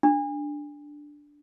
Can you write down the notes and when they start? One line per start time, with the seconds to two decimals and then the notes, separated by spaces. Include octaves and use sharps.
0.03 D4